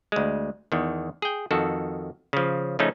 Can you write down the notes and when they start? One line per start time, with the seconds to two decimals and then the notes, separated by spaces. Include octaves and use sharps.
0.12 D2 G#3
0.72 E2 D#3
1.22 G#4 G5
1.51 F2 D#3 F#4 A4
2.33 C#3 F3
2.79 C#3 F3 A3 C#4 D#4